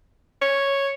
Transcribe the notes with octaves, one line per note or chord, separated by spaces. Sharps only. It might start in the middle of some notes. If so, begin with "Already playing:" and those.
C#5